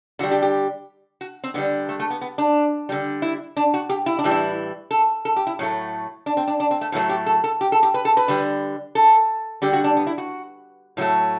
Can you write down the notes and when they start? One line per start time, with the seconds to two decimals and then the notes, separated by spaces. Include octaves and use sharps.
0.19 D3 F#4
0.23 G3
0.31 G4
0.42 G4
1.21 F#4
1.44 C4
1.54 D3 G3 B3
1.89 A3
2.00 A3
2.10 B3
2.21 B3
2.38 D4
2.89 D3 G3
3.22 E4
3.57 D4
3.74 F#4
3.89 G4
4.06 E4
4.19 D4
4.24 A2 E3 G3
4.31 E4
4.91 A4
5.25 A4
5.36 G4
5.47 E4
5.59 A2 F#3 A3
6.26 D4
6.37 C4
6.48 D4
6.60 D4
6.71 C4
6.81 A3
6.92 A2 F#3 A3 B3
7.09 G4
7.26 A4
7.44 A4
7.61 G4
7.72 A4
7.83 G4
7.94 B4
8.05 A4
8.17 B4
8.28 D3 G3
8.95 A4
9.62 D3 G3 G4
9.73 F#4
9.84 D4
9.96 B3
10.07 E4
10.18 F#4
10.97 A2 F#3 A3